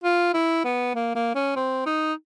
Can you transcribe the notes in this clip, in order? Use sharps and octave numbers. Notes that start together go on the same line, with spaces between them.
F4
E4
B3
A#3
A#3
C#4
C4
D#4